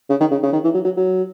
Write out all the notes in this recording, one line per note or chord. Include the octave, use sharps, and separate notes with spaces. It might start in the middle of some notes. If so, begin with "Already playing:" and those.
C#3
D#3
C#3
C#3
D#3
E3
F#3
F#3
F#3